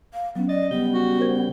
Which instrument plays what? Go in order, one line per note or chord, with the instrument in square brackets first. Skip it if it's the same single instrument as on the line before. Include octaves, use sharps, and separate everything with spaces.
[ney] F5
[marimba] F#3 C#4 [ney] B3
[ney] D5 [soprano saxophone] D#5 [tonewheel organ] A6
[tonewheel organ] C#3 G3 G6 [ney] B3
[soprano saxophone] F#4
[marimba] A#4 C5 G#6